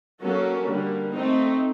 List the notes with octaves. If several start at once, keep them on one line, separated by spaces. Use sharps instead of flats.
F#3 A#3 C#4 F#4 A4
D3 G3 A#3
A3 C4 D#4